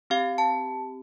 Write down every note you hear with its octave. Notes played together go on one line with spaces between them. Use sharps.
C4 G4 F5
A5